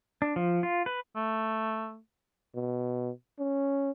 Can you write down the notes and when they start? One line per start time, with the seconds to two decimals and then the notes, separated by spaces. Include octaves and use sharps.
0.22 D4
0.36 F3
0.63 F4
0.86 B4
1.16 A3
2.55 B2
3.39 C#4